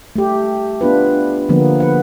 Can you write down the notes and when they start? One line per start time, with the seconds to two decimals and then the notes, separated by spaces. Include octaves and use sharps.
0.16 A3 G4
0.81 B3 D4 F4 B4
1.49 D3 F3 A#3 B3
1.80 B4 F#5